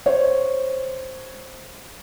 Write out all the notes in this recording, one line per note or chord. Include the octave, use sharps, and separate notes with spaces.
C5 C#5